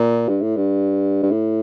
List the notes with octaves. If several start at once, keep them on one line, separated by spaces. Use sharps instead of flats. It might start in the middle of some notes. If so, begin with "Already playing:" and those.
Already playing: A#2
G2
A2
G2
G2
A2